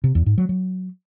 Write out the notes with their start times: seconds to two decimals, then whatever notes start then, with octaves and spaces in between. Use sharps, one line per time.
0.04 C3
0.15 E2
0.26 G#2
0.38 F#3
0.49 F#3